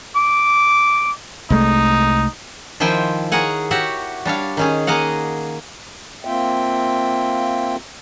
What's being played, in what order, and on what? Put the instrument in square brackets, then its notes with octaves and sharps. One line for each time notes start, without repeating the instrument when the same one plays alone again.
[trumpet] D6
[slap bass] C2 G#3 A3 [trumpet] D#4
[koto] D#3 F3 E4 C5 G5 G#5
G#4 A#4 C#5 F#5 G#5
F#4 G4 C#5 E5 F#5
G3 D4 C#5 F5
D#3 C#4 G#4
A#3 G#4 D#5 F5 F#5
[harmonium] A#3 C4 F4 E5 G5